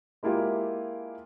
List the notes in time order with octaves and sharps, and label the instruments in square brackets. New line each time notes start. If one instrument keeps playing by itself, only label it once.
[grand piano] G#3 A#3 E4 F4 G4